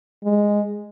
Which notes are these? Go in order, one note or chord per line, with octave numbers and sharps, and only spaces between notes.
G#3